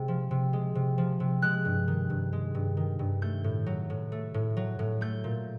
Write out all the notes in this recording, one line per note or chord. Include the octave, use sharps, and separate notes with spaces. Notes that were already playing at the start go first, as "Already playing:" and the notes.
Already playing: C3 G#3
F3
C3
G#3
C3
F3
C3
G#3 F#6
G2
D#3
G2
G#3
G2
D#3
G2
A3 G6
A2
F#3
A2
A3
A2
F#3
A2
A3 G6
A#2